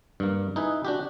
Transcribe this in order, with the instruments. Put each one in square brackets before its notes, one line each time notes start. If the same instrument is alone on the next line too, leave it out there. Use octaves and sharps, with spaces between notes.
[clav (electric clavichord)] G2 A#3
D#4 E4 G#4 B4
D4 F#4 G4